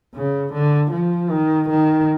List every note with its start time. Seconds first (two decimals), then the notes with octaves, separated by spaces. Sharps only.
0.14 C#3
0.53 D3
0.92 F3
1.30 D#3
1.69 D#3